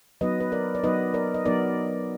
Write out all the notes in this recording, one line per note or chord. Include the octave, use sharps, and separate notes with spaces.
F#3 B3 D#4 B4 D#5
B4
A#4 D5
D5
F#3 B3 D#4 B4 D#5
A#4 D5
D#5
F#3 B3 D#4 A#4 D5